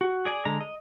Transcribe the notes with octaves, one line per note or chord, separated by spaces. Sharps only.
F#4
G#4 D5 G#5
D3 G#3 A#5
D#5